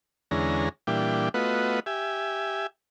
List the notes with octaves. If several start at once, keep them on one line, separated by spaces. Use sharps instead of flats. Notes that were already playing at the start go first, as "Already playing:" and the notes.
E2 D3 G#3 C#4 A#5
A#2 E3 G3 D4 G5
A3 B3 F4 F#4 B4 D#5
G4 E5 G#5